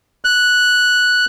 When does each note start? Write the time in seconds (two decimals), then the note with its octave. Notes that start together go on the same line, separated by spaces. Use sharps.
0.25 F#6